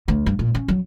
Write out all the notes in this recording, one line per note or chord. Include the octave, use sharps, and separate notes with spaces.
D2
G2
A#2
C#4
F#3